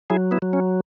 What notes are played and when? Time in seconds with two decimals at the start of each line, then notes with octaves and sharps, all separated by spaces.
0.10 F#3 E4 G#4
0.31 B3 E4
0.42 F#3
0.53 C#4